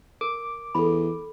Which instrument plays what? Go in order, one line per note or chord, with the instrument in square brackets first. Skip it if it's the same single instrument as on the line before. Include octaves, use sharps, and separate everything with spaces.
[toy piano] A#4 [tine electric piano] D6
[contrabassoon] E2 [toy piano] A4 B5